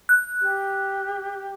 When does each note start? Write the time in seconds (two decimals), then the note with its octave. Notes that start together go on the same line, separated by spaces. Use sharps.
0.09 F#6
0.42 G4